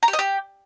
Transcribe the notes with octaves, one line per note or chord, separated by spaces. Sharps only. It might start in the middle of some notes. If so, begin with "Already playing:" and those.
A#5
G4
D#5
G4